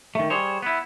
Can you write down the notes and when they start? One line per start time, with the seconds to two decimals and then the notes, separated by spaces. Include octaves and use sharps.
0.15 D#3 A3
0.30 G3 G#4 C5 C#5
0.62 B3 E4